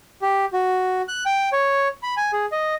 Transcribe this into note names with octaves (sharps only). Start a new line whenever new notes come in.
G4
F#4
F#6
G5
C#5
B5
G#5
G#4
D#5